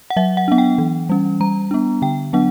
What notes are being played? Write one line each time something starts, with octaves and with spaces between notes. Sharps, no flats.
F#5
F#3 E5
F#5
B3 D4 F#5
G5
E3
G3 C#4
G3 A#5
B3 D4
D3 G5
F#3 B3 D4 F#5